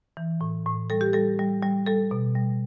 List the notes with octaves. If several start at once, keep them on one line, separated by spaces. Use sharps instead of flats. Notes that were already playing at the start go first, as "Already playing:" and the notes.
E3
A2
A2
G3 A4
G4
G3 A4
G3
G3
G3 A4
B2
G3